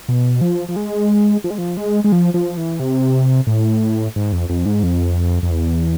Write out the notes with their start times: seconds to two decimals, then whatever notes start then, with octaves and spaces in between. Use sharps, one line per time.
0.09 B2
0.41 F3
0.69 F3
0.76 G#3
1.44 F3
1.50 G#3
1.58 F3
1.77 G#3
2.04 G#3
2.12 F3
2.34 F3
2.57 E3
2.80 C3
3.47 A2
4.16 G#2
4.33 F2
4.49 F2
4.66 G#2
4.83 F2
5.43 F2
5.51 E2